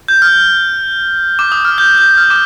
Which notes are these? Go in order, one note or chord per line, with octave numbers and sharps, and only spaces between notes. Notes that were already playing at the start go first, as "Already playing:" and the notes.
G6
F6
D6
D#6
F6
G6
G6
F6
D6